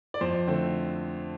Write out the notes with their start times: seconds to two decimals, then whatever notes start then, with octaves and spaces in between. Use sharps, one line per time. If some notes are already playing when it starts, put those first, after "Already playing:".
0.14 D5
0.21 F2 C5
0.47 D3 A3 C4